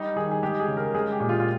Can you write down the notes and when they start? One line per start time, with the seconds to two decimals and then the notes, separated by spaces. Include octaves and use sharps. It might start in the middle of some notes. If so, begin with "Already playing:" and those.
Already playing: G3 D#4
0.16 D#3 G#4
0.32 G#4
0.43 G#3 G4
0.60 G#4
0.68 C#3
0.77 A#4
0.94 G#3 G#4
1.12 G4
1.20 A#2
1.29 F4
1.40 F4